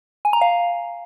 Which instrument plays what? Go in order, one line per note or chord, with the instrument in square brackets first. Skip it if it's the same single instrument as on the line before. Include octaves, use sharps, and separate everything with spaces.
[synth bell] G#5
A#5
F5